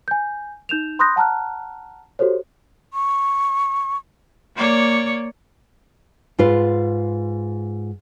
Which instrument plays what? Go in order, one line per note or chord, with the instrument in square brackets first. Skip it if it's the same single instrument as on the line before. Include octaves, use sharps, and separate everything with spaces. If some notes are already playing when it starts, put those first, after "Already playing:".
[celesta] G#5 G6
D#4 G6 E7 F7
B5 C6 D#6 F#6 G6 A#6
F#5 A5 A#5 F6 F#6
F#4 G4 A4 C5 C#5
[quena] C#6
[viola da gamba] A#3 C#5 D5
[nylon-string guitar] G#2 F4 B4